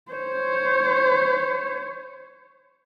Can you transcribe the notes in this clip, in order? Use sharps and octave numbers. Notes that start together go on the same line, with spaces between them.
C5 C#5